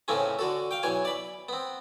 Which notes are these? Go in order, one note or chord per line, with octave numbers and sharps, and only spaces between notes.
A2 C#3 E3 A3 C4 C#4
D3 F#4 A4
F5 G5
B1 E3 C#5 G#5
D5 B5
B3 C4